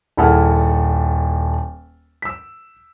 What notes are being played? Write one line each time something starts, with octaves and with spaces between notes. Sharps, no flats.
D#1 E4 G#4 A4 F#5 F6
E6 B6